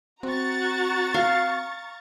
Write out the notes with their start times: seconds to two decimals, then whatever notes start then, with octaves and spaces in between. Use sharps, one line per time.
0.23 C4 F#4 A#5 C#6 A6
1.14 F5